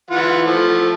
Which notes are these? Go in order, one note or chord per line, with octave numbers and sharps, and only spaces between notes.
E3 F4 F#5
F3 A3